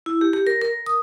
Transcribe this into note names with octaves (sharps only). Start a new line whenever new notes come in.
E4
G4
G4
A#4
A#4
D#6